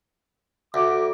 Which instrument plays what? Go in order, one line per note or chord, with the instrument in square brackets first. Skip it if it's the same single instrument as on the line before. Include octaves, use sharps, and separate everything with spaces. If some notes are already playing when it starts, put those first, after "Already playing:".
[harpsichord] D2 [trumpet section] D6